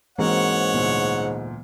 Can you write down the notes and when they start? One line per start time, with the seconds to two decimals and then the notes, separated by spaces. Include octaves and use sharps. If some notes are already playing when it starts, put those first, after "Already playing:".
0.19 G#2 E3 G#3 A#3 C4 F#4 C#5 F#5
0.74 D2 A#2 B3